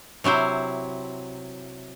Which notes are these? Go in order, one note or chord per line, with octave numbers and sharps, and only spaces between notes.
C3 F#3 E4 C5